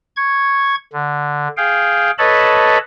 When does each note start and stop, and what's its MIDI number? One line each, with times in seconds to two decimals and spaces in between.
0.16 0.75 85
0.16 0.75 92
0.93 1.48 50
1.57 2.11 68
1.57 2.11 77
1.57 2.11 79
2.18 2.78 69
2.18 2.78 71
2.18 2.78 73
2.18 2.78 75
2.18 2.78 81
2.18 2.78 83